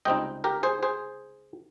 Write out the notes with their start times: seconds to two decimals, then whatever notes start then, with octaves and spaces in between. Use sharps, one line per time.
0.05 C#2 C3 G3 C4 D#4 D#5 G5
0.44 G4 A#4
0.63 G#4 C5
0.83 G#4 C5